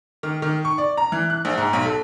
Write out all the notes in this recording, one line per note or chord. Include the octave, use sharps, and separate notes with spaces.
D#3
D#3
C#6
D5
A#5
E3
F#6
A#1
G#2
B1
A4